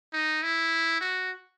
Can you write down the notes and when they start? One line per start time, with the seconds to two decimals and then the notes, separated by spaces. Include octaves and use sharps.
0.14 D#4
0.43 E4
1.01 F#4